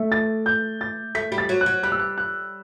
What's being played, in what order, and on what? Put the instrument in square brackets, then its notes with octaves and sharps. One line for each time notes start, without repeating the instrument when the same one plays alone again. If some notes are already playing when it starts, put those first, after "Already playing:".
Already playing: [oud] A3
[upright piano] A6
G6
A6
[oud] A3 [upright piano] B6
[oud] G3
[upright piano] A6
[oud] F#3
[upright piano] F#6
[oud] F#3
[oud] G3 [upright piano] F#6
[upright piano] E6
F#6
F#6